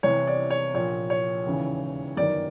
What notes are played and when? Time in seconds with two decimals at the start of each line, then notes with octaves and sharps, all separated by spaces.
0.03 C2 C3 E3 C#5
0.27 D5
0.50 C#5
0.74 A#1 A#2 C#5
1.10 C#5
1.46 E1 D#2 C#3 E3
2.17 G1 F#2 D#3 D5